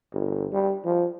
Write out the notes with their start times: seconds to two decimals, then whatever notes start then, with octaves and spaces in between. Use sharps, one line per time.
0.13 G1
0.53 G3
0.84 F3